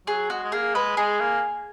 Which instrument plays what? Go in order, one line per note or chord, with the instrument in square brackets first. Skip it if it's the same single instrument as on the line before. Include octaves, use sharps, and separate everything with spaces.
[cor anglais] F#3 [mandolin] G#4
[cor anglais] G#3 [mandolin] F#4
[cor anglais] G#3
[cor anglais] A#3 [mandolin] G#4
[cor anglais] G#3 [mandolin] B4
[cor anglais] G#3 [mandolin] G#4
[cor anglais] A#3